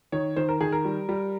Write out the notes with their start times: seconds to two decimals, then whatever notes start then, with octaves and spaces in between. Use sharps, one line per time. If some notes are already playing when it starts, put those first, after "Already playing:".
0.12 D#3 C#5
0.36 D#3 C5
0.49 A#4
0.61 D#3 G#4
0.72 A#4
0.85 G3
1.09 G3